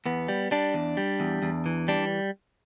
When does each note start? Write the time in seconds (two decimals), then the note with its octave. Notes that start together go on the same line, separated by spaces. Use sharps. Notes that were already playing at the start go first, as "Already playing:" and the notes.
0.06 E2 B3
0.28 G3
0.51 G3 D4
0.74 E2
0.97 G3
1.20 E2
1.43 E2
1.66 E3
1.88 G3 D4